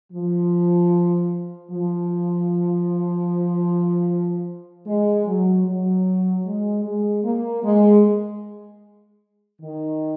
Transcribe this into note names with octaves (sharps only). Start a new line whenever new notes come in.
F3
F3
G#3
F#3
F#3
G#3
G#3
A#3
G#3
D#3